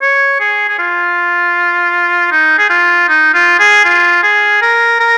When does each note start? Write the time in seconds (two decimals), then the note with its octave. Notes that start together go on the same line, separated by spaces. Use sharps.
0.02 C#5
0.40 G#4
0.68 G#4
0.79 F4
2.32 D#4
2.58 G#4
2.70 F4
3.09 D#4
3.34 F4
3.60 G#4
3.85 F4
4.23 G#4
4.62 A#4
5.00 A#4